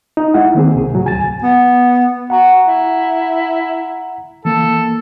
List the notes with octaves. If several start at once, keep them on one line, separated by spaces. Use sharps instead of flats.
D#4
G#3 E4 F#5
D#3 A#3 C4 G#4
C#2 C3 G#4
A2 F#3
D2 G#5 A6
B3
F#4 F#5 A#5
E4
E3 A#3 A4